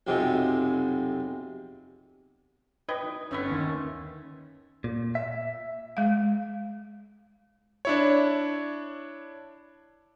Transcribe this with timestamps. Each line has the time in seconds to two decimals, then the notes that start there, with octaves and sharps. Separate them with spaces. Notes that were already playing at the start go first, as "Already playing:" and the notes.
0.07 B1 F2 C3 G#3
2.89 B4 D#5 G5 G#6
3.03 D#4
3.31 G1 E3 A3 B3 C#4
3.50 D#2 D#3 C6
4.84 A#2
5.15 E5
5.97 G#3 F5
7.85 D4 E4 C#5